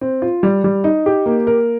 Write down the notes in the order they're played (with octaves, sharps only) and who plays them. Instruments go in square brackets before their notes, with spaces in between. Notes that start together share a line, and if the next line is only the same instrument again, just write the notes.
[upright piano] C4
F4
G3
G3
D#4
G4
A#3
A#4